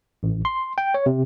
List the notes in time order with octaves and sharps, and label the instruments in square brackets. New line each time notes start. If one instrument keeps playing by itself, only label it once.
[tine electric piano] A1
C6
G5
C#5
C3